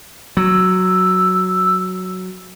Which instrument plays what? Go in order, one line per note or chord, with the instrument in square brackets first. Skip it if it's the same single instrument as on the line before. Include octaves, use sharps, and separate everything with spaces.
[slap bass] F#3 [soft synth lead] E6